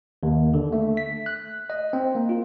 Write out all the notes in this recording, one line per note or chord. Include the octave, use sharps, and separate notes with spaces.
D#2
D3
A3
B6
F#6
D#5
C4
A#3
F4